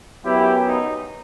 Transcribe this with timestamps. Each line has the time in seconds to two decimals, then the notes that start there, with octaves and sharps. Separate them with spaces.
0.25 F#2 F#3 B3 E4 G4
0.65 D#4